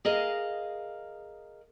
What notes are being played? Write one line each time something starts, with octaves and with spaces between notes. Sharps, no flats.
G#4 A#4 D#5 F5